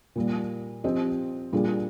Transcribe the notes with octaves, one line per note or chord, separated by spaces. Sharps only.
A#2 G3 A#3
F3 C4 G4 C5 D#5
A#2 G3 D4 F4 G#4